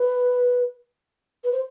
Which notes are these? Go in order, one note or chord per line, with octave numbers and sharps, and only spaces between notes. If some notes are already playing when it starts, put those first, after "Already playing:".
Already playing: B4
B4
C5